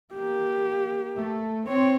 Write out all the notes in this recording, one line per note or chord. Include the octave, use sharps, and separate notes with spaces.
A#3 G4
A3
C4 C#5